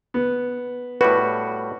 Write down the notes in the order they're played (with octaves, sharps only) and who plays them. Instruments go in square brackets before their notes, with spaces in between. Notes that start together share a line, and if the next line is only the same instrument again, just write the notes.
[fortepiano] B3
[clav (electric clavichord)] A2 G3 F#4 [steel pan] B4